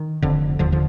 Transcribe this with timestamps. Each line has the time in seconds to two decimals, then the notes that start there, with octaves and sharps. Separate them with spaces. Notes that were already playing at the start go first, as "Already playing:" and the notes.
Already playing: D#3
0.22 F1 F2 D3
0.59 F1 D#2 D3 F3
0.72 D3 F3